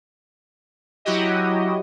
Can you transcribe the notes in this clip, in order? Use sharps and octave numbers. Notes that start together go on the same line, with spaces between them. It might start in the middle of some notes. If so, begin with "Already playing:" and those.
F#3 E4 F#4 G4 D#5